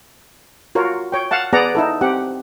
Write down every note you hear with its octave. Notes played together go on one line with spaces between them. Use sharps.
F4 F#4 A#4 C#5
C#5 G5
F5 F#5 A5
B3 G#4 D5 F#5 A#5
D#4 E4 A4
C4 G4 F#5